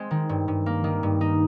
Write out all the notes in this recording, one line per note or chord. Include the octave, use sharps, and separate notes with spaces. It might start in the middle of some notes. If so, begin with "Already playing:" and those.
Already playing: G#3 C4
D#3
G2
G2
A#3
D#3
G2
D#4